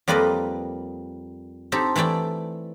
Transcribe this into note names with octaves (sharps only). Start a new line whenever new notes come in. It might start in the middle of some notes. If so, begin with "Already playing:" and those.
F2 G3 A#3 B4 D5 D#5
C4 D#4 G4 A4
E3 A3 E4 D5 G5